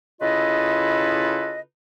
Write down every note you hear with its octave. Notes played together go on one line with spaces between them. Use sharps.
C#3 E4 F4 A4 B4 D#5